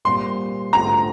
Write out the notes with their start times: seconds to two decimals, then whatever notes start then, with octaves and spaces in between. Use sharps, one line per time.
0.05 A#2 G3 C4 C6
0.73 D3 A3 C4 F4 A#5